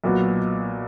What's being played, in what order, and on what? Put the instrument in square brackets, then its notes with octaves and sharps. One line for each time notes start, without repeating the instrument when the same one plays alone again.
[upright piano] B1 A#2 F#3 B3 F#4